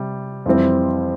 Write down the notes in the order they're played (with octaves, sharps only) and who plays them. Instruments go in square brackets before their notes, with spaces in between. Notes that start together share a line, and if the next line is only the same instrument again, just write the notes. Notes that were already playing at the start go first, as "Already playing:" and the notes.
Already playing: [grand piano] C3 G3
F2 E3 G3 C4